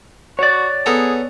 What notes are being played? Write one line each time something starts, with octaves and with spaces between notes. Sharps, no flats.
F#4 C#5 D5
B3 G#4 A4 A#5